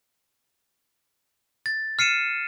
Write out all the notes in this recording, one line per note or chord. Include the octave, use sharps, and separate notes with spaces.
A6
F6 C7 C#7 D#7 E7